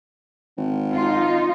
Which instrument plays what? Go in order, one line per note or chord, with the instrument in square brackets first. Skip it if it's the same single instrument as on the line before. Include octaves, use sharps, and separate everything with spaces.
[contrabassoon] G#1
[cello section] D#4 F4